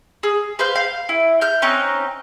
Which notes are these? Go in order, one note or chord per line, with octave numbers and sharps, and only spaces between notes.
G#4
B4 C5 F5 G6
F5
E4
F6 G6
C4 C#4 D#4 F#6